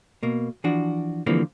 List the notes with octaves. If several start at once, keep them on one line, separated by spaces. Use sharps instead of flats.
B2 A#3
E3 F3 D4 F#4
D3 E3 F3 G3 A#3 C4